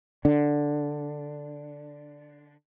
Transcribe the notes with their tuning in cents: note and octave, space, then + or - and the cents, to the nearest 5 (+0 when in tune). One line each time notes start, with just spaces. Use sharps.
D3 +0 D4 +0